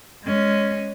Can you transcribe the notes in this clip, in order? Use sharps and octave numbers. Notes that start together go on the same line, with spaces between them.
G#3 C#4